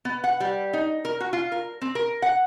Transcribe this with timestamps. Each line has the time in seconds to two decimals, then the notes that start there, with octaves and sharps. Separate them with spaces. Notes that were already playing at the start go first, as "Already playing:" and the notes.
0.05 B3
0.24 F#5
0.40 G3
0.73 D#4
1.05 A#4
1.20 F#4
1.33 F4
1.52 A#4
1.82 C4
1.95 A#4
2.22 F#5